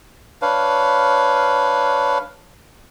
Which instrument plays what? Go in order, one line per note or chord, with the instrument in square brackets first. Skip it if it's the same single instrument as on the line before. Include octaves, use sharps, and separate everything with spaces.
[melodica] D4 B4 C#5 F5